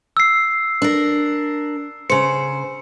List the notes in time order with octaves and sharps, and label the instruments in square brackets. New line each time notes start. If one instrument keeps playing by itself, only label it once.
[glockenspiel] E6 C7
[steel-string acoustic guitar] D4 A#4
[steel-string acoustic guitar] C#3 C5 [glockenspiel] C#7